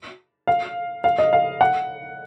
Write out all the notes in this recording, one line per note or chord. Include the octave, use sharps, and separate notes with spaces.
F5
F5
D#5
F5
F#5